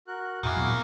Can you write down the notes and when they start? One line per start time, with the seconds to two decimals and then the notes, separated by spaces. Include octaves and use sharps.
0.08 F#4 A#4 F#6
0.43 E2 A2 D#3 A#3 E4 F#4 G#4
0.56 A#2 F#3 B3